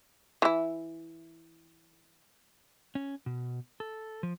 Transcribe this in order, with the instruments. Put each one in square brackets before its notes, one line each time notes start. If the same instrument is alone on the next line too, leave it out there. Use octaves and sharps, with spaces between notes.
[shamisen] E3 E4
[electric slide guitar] C#4
B2
A4
F3